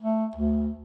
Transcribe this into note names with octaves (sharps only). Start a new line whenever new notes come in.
A3
D2